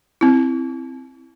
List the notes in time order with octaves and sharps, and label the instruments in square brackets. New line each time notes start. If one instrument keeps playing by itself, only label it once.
[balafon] C4 E4